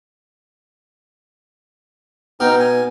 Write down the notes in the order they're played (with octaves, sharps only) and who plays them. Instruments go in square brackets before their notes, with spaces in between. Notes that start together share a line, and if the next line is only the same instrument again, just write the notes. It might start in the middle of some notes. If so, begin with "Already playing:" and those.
[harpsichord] B2 [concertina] D#4 G5 F6
[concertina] G#5